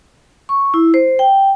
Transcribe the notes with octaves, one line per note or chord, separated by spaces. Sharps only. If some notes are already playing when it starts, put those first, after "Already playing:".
C#6
E4
C5
G5